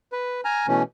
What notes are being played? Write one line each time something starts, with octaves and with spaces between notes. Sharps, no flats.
B4
G#5 A#5 F6
B2 E3 A3 C#4